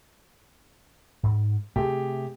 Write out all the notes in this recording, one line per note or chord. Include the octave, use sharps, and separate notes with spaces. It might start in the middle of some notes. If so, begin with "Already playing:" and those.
G#2
C3 A3 C4 G4 G#4